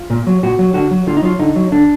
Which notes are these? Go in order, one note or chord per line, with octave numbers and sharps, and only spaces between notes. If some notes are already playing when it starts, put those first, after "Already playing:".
Already playing: F4
A#2
F#3
A#2 F#4
F#3
D3 F#4
F#3
D3 F4
D#4
F#3 F4
D3 D#4
F#3
D3 D4